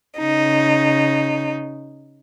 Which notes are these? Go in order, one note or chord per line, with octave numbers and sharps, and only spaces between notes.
C#3 D#4